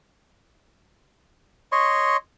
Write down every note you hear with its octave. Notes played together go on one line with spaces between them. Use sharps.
C#5 D#5 C6 C#6